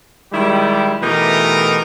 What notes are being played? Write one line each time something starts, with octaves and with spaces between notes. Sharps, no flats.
D#3 G3 G#3 E4 G4
B2 E3 A3 D#4 G4 A#4